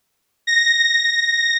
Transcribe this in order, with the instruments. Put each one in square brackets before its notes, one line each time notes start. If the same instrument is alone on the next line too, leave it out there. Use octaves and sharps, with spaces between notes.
[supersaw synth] A#6